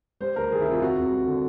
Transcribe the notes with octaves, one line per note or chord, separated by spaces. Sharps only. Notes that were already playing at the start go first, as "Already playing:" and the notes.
G3 C5
D2 A#4
D#3 G#4
E4
C3 F4
F2 F#4
F2
G3
D3